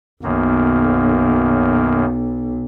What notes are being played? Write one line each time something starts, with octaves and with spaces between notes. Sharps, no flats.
B1 F#2 D#3 A#3